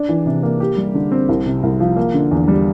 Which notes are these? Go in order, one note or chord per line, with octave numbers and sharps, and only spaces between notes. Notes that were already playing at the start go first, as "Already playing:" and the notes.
Already playing: D4
E3
C3
A#3
G4
G3
D3
C4
C2
C3
C2
F3
A#3
D3
E2
G3